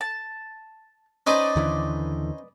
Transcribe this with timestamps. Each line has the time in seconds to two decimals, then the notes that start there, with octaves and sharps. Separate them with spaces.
0.01 A5
1.27 C#4 D#4 B4 C5 D5 D#5
1.56 D#2 D3 E3